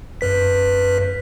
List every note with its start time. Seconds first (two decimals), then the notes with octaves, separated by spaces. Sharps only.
0.21 F#2 B4 B6